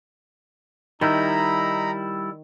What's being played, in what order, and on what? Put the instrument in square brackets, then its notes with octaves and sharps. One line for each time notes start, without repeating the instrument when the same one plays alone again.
[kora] D#3 [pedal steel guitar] G3 E4 [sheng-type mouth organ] D#4 A#5 B5